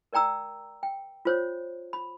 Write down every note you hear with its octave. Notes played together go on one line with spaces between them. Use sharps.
A#4 D5 G5 A#5 E6
G5
F4 C5 C#5
B5